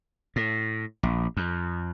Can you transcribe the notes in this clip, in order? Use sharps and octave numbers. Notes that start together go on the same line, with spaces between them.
A2
A#1
F2